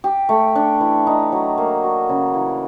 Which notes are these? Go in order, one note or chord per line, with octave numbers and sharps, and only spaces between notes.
G4
A3
D4
E3
D#4
F#3
A#3
F#4
C#3
E3